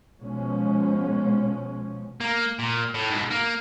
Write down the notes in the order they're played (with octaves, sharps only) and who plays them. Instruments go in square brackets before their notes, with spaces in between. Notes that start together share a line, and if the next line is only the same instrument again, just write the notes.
[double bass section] B2 F3 G#3 C#4
[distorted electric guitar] A#3
A#2
A2
G#2 B2
A#3